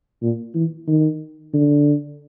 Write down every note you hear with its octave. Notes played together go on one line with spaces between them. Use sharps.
A#2
E3
D#3
D3